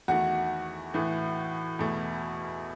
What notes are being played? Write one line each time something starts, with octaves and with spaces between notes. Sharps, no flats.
E2 D#3 A3 F#4 F#5
A2 E3 A3
E2 B2 A3